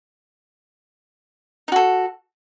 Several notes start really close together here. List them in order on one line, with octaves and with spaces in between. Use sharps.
D#4 F#4 A4